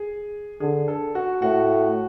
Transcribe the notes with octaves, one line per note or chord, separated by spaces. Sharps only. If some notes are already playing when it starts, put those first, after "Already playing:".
Already playing: G#4
D3 G#4
A4
F#4
A2 F#4